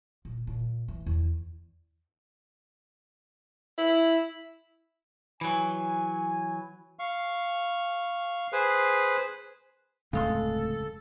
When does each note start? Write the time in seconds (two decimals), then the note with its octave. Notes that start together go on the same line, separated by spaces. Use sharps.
0.25 A#2
0.47 A#2
0.88 E3
1.06 E2
3.78 E4
5.41 E3 F#3 G#5
6.99 F5 C#6
8.53 G#4 B4 C5
10.13 D1 F2 C#3 G#3 A3 A4 C6